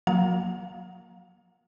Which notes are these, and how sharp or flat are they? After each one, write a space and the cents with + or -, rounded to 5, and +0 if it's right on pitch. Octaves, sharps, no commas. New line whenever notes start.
F#3 -30 A#3 +0 F5 +25